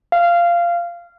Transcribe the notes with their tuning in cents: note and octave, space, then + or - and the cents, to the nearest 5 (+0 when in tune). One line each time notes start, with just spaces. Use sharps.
F5 -15